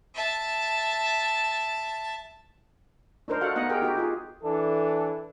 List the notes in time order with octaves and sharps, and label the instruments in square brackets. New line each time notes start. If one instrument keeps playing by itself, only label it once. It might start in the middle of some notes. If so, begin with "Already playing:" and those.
[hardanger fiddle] E5 A5
[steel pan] D4 D#4 A#4 C5
F#4 A4 F5 F#5
B3 D#4 D#5 F5 F#5
G4 G#4 A#4 G5
D#4 F#4 G4
D#4 F4 G#4
[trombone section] E3 D4 A4